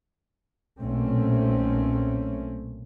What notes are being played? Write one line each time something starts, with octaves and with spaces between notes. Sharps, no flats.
B1 A#2 A3 C4 C#4